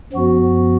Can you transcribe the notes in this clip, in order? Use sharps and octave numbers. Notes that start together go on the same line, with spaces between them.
F#2 F3 B3 F#4